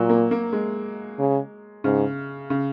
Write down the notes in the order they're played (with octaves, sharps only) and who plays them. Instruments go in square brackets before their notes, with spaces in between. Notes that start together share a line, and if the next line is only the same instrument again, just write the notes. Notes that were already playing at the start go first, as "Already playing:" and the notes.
Already playing: [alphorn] A#2 [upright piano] F#3
[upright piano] A#3
A#3
G#3
[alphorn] C#3
[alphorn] G#2 [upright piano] C#3
[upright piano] C#3